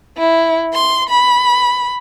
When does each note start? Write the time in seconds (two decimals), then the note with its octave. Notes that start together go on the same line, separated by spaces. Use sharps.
0.18 E4
0.74 C6
1.09 B5